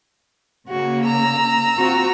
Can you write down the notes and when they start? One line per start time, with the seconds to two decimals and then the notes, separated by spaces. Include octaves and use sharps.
0.69 C#3 A#3 F#4
1.05 A#5 E6
1.78 C4 F4 F#4